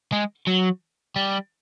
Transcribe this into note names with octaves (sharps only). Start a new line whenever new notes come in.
G#3
F#3
G3